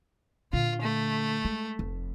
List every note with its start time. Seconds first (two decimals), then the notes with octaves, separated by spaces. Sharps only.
0.53 A#2 D3 F4
0.82 A3
1.45 G#3
1.79 F1